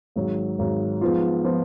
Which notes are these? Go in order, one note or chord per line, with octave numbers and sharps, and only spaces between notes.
G#1 G#2 F#3
G#1 G#2 F#3
G#2 F3 B3 F4
F3 B3 F4